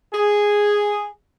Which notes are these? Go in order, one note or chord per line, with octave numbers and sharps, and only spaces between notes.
G#4